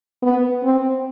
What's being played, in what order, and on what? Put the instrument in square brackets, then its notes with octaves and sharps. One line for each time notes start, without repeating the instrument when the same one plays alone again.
[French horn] B3
C4